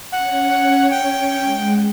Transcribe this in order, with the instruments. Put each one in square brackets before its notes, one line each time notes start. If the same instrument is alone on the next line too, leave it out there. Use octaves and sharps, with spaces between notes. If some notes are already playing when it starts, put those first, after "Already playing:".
[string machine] C#4 C#5 [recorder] F#5
[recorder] G5
[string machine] G#3 F#5